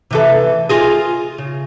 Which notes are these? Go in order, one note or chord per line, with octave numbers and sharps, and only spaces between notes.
C3 E3 A4
F4 G#4 D#5
C#3